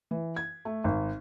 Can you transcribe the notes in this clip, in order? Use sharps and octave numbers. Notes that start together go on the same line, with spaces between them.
E3
G#6
A3
G#1